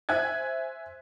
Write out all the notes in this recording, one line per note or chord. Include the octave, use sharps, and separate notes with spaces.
C5 E5 G#5 F#6 G#6